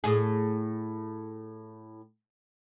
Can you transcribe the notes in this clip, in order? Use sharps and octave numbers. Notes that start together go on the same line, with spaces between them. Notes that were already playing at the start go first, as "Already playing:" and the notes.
A2 G#4